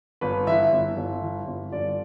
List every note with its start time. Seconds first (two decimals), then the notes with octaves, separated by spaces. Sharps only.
0.21 G1 B4
0.47 E3 E5
0.72 G1
0.97 G1
1.22 E3
1.47 G1
1.72 G1 D5